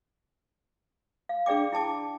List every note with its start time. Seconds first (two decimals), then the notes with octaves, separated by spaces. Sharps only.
1.29 F5
1.46 D4 G#4 D5 G5 D6
1.72 E4 G5 A5 D6